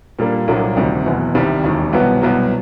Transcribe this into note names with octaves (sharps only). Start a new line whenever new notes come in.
A#2 G3 A#3 D4
C2 A#2 F#3 A#3 D4
D2 C3 D#3 G3
F#1 E2 B2
C2 C3 D#3 G3
E1 D#2 D#3
C2 B2 F#3 B3
C2 B2 F#3